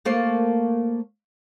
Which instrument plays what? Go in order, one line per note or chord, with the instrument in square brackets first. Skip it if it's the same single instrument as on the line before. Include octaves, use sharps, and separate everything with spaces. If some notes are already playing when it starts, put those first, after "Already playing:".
[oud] A3 A#3 C5